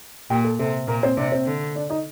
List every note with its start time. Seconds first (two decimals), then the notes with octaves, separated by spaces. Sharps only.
0.30 A#2 G4 G5
0.44 A4
0.59 C3 A4
0.88 A#2 A#3 A#4
1.03 C4 C5
1.17 C3 D4 D5
1.32 C4 C5
1.46 D3
1.76 D4 D5
1.90 D#4 D#5